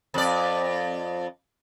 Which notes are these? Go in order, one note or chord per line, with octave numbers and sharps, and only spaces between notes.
F2 D5